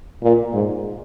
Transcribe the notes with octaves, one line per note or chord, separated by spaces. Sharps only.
A#2
G#2